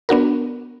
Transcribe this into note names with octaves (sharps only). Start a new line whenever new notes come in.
B3 D4 F#4 A#4